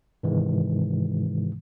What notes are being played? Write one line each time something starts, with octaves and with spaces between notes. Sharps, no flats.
G#2 C3 D#3 E3 G#3